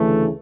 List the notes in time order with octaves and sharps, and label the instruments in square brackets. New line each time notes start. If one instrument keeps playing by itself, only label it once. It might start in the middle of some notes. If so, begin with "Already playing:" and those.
Already playing: [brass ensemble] D2 C#3 E3 A3